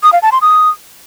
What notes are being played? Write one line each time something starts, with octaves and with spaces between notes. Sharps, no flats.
D#6
F5
A5
C6
D#6